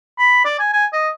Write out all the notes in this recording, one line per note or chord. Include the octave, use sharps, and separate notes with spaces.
B5
D5
G#5
G#5
D#5